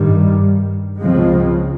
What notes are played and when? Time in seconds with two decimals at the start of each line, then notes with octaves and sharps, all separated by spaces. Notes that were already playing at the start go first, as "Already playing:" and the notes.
Already playing: G2 D#3 G3
0.99 C#2 C#3 F3 G#3 C4